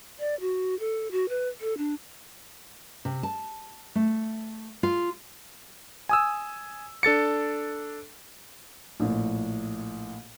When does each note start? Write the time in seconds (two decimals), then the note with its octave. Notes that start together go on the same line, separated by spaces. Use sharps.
0.19 D5
0.40 F#4
0.79 A4
1.11 F#4
1.29 B4
1.61 A4
1.78 D4
3.05 C3
3.23 A5
3.95 A3
4.83 F4
6.09 G#5 D#6 E6
7.03 D4 A4 A6 C#7
9.00 A#1 A2